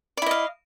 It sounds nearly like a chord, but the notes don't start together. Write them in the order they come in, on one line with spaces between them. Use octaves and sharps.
D5 E4 D#5 F5